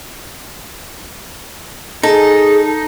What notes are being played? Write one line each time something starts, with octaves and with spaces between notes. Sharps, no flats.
D#4 G#4 A4